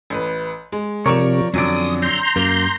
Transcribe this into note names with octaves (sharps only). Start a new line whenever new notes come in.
A1 B4
G#3
C3 F3 A#4 C#5 D5 C#6
F2 D3 F#3 C#4 D5 D#6
A#5 C6 G6
F#2 A#3